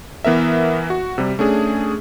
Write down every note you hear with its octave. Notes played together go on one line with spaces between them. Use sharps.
E3 B3 A#4 E5
F#4
C3 G3
A3 C#4 D4 G#4